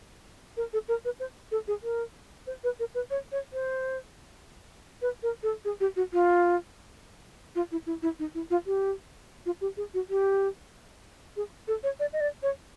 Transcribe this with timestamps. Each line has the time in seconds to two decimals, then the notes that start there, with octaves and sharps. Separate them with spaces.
0.57 A#4
0.73 A4
0.88 A#4
1.05 B4
1.20 C5
1.51 A4
1.68 G#4
1.83 A#4
2.47 C5
2.64 B4
2.79 A#4
2.95 B4
3.10 C#5
3.32 C#5
3.53 C5
5.02 B4
5.23 A#4
5.43 A4
5.65 G#4
5.80 G4
5.96 F#4
6.13 F4
7.55 F4
7.72 E4
7.86 E4
8.02 E4
8.19 D#4
8.35 E4
8.50 F4
8.66 G4
9.46 F4
9.61 G4
9.77 G#4
9.94 F#4
10.10 G4
11.36 G#4
11.68 A4
11.83 C#5
12.00 D5
12.13 D#5
12.20 D5
12.43 C#5